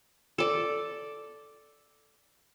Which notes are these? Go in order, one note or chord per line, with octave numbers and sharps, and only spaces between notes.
A4 D5